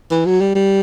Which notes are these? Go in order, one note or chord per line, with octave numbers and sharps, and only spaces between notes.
E3
F#3
G3
G3